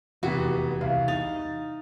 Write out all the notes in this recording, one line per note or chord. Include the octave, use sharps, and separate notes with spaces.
F1 E2 E3 B3 F#4 G4
C2 F5
D#4 A6